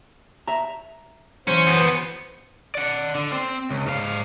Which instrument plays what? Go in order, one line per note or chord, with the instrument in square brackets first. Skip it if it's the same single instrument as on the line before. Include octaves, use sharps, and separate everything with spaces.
[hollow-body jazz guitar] E5 A#5
[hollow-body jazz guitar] E3 F#3 [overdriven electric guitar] C#4 [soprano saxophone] C5
[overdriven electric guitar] F#2 B3
D5 F#5
D3
C4
C#2
G#2 F5